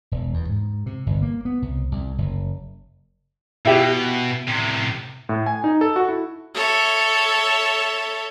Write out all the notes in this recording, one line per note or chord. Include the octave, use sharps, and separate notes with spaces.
E1
E2
G#2
C3
G1
A#3
B3
C2
C2
F#1
B2 E4 G4
A2 C3
A2
G#5
D#4
A4
F#4
E4
A4 C#5 E5